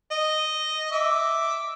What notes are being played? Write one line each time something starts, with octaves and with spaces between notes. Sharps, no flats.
D#5
E5 D6